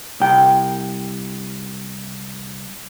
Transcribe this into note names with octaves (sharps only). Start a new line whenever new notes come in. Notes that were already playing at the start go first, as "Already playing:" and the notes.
C2 G5